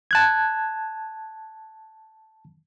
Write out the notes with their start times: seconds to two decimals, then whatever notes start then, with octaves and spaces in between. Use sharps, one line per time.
0.11 A5 F#6 G#6